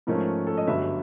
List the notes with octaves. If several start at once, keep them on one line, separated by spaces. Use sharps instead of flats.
G#2 F3 A3 C#4 A#4
A4
D#5
G1 G2 D3 F#3 E5